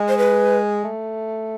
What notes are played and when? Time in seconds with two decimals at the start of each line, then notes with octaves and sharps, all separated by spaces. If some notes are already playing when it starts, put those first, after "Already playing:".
Already playing: G#3
0.08 C5
0.18 B4
0.84 A3